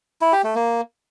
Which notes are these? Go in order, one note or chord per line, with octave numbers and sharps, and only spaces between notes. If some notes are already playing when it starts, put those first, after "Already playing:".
E4
G4
A3
A#3